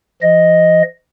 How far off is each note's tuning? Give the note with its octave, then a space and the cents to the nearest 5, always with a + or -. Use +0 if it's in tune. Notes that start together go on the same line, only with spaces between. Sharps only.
F3 -40 D#5 +0